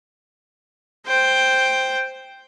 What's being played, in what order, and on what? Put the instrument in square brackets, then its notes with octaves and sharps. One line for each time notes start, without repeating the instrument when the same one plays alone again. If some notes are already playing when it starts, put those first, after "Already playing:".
[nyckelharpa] C5 G5